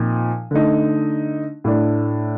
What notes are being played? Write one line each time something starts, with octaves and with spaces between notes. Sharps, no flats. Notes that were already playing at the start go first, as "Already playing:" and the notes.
Already playing: A#2 F3 C4 D#4
D3 A3 D#4
A2 A3 D4